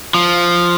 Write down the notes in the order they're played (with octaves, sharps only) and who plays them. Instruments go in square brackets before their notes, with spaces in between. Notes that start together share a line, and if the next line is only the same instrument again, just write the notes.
[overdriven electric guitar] F3